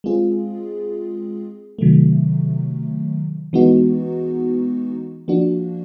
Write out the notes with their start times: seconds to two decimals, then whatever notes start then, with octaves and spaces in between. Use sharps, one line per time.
0.04 G#3 C4 F4 G#4
1.79 C3 D#3 F#3 A3
3.53 E3 G#3 B3 D#4 F#4
5.28 F3 A#3 D4 F#4